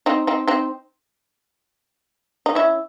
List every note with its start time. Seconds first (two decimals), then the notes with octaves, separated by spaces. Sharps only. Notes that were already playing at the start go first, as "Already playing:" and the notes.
0.06 C4 D#4
0.27 C4 D#4
0.48 C4 D#4
2.46 D#4
2.55 C#4 E4